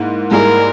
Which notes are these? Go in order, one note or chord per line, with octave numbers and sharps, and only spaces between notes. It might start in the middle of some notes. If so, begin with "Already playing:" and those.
Already playing: G#2 A#3 E4
G#2 G3 A#3 E4 G#4 A#4